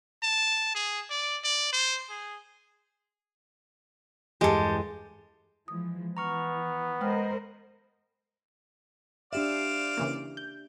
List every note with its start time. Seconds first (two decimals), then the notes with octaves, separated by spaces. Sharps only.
0.23 A5
0.75 G#4
1.10 D5
1.44 D5
1.73 C5
2.09 G#4
4.41 E2 G2 G3 G#3 G4 A4
5.68 E3 F3 G#3 D#6
6.17 E3 B3 A#5 C#6 F6
7.01 G#3 A#4 C5 D#5 G5 B5 F6
9.33 D4 G4 C5 D5 E5 F5 E7
9.98 C#3 E3 A#3
10.37 G6